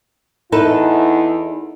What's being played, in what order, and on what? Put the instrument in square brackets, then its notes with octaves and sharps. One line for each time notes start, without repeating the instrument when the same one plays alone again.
[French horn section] E2 E4 [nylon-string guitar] D#4 A4 B4